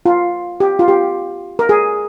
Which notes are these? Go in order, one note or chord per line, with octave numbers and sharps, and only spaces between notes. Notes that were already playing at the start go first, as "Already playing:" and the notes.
F4
G4
F4
G4
A#4
G#4